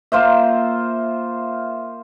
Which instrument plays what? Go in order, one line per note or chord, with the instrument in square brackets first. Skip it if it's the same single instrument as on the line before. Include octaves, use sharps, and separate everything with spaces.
[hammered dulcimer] A#3 F4 C5 E5